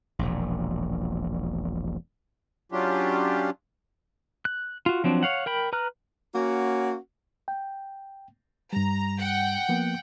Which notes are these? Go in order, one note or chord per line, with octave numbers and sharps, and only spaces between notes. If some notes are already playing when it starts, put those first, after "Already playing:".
E1 A#1
F#3 C#4 D4 F4 G4
F#6
F4 F#4
F3 F#3 C4 D4
C#5 F5 F#5
A#4 G5 B5
B4 A#5 F6 F#6
A#3 C#4 F#4
G5
G2 G3 A#5
F#5 G5
F3 A#3 B3